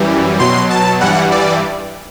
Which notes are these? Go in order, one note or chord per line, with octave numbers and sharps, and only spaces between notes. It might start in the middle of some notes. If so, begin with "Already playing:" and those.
Already playing: F#2 E3 G3
B2 F#3 C6
A5
G2 E3 G3 F#5
D5